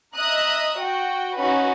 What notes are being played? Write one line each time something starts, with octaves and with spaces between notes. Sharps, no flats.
D#5 E5 A#5 D#6 F#6
F#4 G5
C#4 D#4 F#4 B4